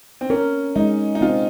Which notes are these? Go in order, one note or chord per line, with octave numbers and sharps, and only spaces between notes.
C4
C#4 A#4
G#3 D#4
D#4
C4 F4